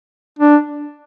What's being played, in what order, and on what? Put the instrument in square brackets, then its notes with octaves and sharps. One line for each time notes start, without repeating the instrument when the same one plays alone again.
[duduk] D4